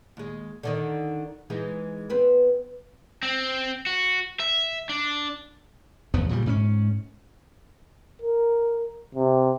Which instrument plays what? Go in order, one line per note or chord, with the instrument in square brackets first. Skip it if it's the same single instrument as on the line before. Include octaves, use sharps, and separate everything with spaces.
[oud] D#2 G#3
D3 D#3 D#4
E3 G#3 D#4
B3 C4 B4
[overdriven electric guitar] C4
F#4
E5
D4
[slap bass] F1 E2 F3 B3
A#2 C#3 E3 G3
G#2 C4 C#4
[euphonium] A#4
C3